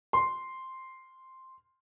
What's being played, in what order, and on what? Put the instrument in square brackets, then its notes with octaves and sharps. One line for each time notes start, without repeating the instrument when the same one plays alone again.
[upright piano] C6